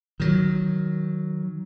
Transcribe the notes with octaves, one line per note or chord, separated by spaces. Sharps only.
D#3 F#3